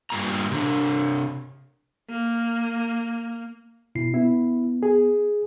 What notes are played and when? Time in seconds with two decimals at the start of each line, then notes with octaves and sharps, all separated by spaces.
0.10 G2 A#2 A#5
0.52 C3 D4
2.09 A#3
3.95 B2 E4 C7
4.14 B3 E4
4.83 G#4